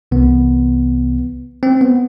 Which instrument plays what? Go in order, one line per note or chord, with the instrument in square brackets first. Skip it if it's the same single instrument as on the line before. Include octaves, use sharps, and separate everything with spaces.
[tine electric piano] C2 C3 E3 B3
C4
B3